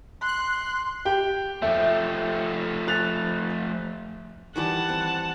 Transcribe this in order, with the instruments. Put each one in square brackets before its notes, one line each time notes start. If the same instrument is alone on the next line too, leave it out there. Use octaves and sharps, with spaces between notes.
[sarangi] C6 [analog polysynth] F#6
[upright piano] G4 G5
[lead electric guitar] F3 A3 [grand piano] E5
[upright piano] F#6 A6 F7
[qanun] D#3 E3 G3 [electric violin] F#5 A5
[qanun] C4